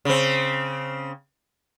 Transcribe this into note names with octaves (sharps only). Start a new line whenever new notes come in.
C#3 C4